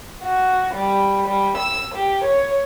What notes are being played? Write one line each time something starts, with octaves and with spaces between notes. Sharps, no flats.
F#4
G3
G3
E6
G4
C#5